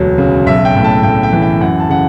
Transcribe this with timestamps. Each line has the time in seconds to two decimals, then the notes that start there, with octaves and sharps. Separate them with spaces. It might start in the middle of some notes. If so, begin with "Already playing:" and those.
Already playing: E1 D2 F#3
0.18 C#3
0.46 B1 E5
0.65 G5
0.75 A2
0.84 A5
1.03 A2 G5
1.23 G5
1.32 E3
1.42 G5
1.60 F#2 F#5
1.80 A5
1.89 C#3 F#5